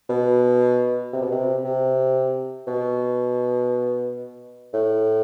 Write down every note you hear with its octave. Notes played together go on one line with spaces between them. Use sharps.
B2
C3
B2
C3
C3
B2
A2